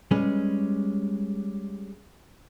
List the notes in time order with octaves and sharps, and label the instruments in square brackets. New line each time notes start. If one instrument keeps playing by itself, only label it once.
[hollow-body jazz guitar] G3 G#3 C#4 G#4 B4